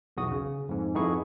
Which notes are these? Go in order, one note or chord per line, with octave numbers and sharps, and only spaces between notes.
B1 E2 F#4 D#6
C#3
F2 G#2
F2 B3 D#4 E4 G#4 C#6